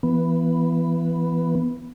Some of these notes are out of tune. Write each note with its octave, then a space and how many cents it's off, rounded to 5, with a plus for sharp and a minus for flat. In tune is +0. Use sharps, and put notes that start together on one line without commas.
E3 +25 B3 +0